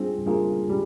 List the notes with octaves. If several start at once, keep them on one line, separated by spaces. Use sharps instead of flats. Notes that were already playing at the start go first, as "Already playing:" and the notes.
Already playing: G3 C4 D4 F4 G#4
G3 A#3 D4 F4 G#4
G3